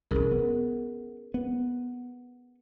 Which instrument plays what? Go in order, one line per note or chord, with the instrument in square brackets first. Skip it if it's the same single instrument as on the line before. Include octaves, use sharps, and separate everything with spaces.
[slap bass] E1 C2 [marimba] C#4 G#4 A#4
[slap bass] B3
B3